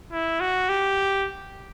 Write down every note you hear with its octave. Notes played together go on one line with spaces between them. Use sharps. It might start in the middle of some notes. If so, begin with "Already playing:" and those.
E4
F#4
G4